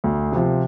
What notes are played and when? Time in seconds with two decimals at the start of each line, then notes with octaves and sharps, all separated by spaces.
0.04 D2
0.32 C3 F3